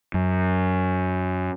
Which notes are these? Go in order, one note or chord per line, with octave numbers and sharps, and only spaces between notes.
F#2